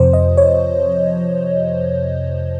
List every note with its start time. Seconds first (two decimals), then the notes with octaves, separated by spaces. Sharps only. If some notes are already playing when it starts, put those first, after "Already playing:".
Already playing: F2 C3 F3 C5
0.13 D#5
0.37 C#5